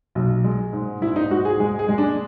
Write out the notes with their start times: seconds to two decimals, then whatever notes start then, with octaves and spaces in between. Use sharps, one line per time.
0.15 B1
0.44 G#3
0.73 G#2
1.02 G#2 E4
1.16 D#4
1.31 G#2 F#4
1.45 G#4
1.60 G#3 G#4
1.79 G#4
1.89 G#3
1.98 D4